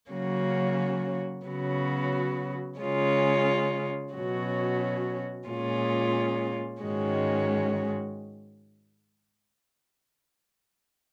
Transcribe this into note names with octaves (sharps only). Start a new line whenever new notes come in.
C#3 F#3 A#3 C#4 F#4
C#3 F#3 B3 F#4
C#3 G#3 C#4 F4
B2 F#3 C#4 F#4
A#2 G#3 C#4 F4
G#2 D#3 G#3 C#4 F#4